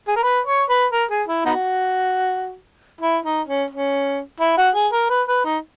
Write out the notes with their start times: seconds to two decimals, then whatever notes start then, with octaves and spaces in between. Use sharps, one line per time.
0.08 G#4
0.16 A#4
0.23 B4
0.47 C#5
0.70 B4
0.92 A#4
1.11 G#4
1.28 E4
1.45 B3 D#4 F#4
3.01 E4
3.25 D#4
3.48 C#4
3.71 C#4
4.41 E4
4.58 F#4
4.75 G#4
4.93 A#4
5.10 B4
5.28 B4
5.45 D#4